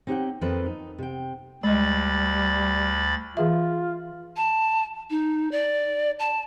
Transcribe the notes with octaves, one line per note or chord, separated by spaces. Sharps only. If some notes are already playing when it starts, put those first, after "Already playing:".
C4 D#4 G4 C#5 F#5 G5
F2 A#3 C4 A4 B4 D#5
D#4
C3 G5
D2 G3 G#3 D#5 B5 A6
E3 F4 G#4 E5
A5
D#4
D5
A5